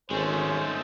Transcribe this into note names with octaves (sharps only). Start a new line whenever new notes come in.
G#1 G#3 A3 C#4 C5